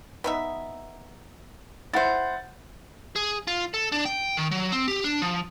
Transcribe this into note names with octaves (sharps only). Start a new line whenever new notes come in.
B3 D#4 E5
E4 C5 E5 F#5 A6
G#4
F4
A4
D4
G5
D#3
F#3
C4
G4
D4
F3